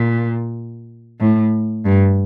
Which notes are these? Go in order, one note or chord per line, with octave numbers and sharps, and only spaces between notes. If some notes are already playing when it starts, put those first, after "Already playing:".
Already playing: A#2
A2
G2